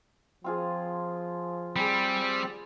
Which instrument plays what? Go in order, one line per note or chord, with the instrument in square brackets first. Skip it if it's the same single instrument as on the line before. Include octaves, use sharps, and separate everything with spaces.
[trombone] F3 [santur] C4 F4 G#4
[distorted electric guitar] G3 [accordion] C4 [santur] G#4 C5 B5